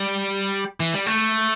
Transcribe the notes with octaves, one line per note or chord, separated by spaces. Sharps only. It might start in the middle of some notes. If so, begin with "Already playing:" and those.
Already playing: G3
E3
G3
A3